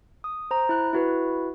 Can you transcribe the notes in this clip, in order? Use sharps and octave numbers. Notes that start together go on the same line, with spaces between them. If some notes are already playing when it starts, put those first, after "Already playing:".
D#6
C5 A#5
E4 F#6
E4 F#4 B4